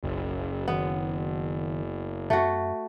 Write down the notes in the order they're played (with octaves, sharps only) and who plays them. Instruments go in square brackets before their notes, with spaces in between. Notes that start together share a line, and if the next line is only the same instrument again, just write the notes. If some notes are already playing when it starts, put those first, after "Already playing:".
[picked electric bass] F#1 [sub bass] B1
[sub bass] D#3 [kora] B3
[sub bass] F#2 [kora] A3 F#4